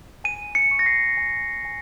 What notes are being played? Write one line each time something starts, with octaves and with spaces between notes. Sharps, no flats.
G#5 D#7
C#7
C#6
A#6
C7
G#5
G#5